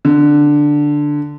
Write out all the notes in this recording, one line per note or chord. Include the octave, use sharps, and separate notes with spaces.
D3